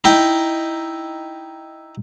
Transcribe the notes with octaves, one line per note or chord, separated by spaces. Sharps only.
D#4 E4 G5